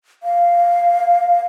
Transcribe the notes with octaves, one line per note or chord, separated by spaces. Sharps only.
F5